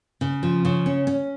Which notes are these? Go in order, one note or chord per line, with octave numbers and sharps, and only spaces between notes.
C#3
F3
C#3
C#4
C#4